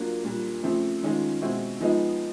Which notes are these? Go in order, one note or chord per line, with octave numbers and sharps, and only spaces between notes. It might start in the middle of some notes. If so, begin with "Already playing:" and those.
Already playing: F#3 A#3 D4 F4
A#2 G3 A#3 D4
C#3 F3 A3 C4
D#3 G#3 C#4 F4
B2 G#3 C4 E4
F3 G#3 B3 D#4